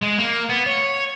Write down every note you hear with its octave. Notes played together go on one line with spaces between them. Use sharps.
G#3
A#3
B3
C#5